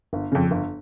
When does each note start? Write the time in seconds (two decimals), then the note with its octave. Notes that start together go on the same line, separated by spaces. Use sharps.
0.13 G1
0.32 F2 C#3
0.51 G1